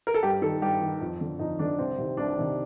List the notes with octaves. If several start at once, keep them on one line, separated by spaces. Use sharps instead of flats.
A#4
A4
G2 G4
D#3 A4
G2 G4
D#3
F2
D3
F2 D#4
D3 D4
C2 C4
C3 D#3
C2 D4
C3 D#3